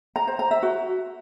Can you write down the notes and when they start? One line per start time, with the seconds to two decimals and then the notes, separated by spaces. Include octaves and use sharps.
0.16 A#5
0.27 C5
0.39 A#5
0.51 E5
0.63 F#4